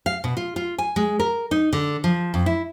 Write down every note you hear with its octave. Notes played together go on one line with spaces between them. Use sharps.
F5
B2
F4
F4
G#5
G#3
A#4
D#4
D3
F3
F2
E4